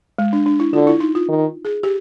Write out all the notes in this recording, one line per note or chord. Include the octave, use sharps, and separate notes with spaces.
G#3
D4
D4
E4
D3 F4
E4
D#4
F4
D#3
G#4
G4